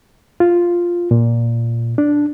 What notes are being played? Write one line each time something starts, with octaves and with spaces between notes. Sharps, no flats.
F4
A#2
D4